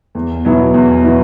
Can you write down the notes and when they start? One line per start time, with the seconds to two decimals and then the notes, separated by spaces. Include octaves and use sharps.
0.15 E2
0.45 B2 F#3 B3 E4
0.74 E2
1.04 B2 F#3 B3 E4